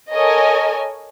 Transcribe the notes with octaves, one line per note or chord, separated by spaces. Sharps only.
A4 A#4 C#5 D#5 G#5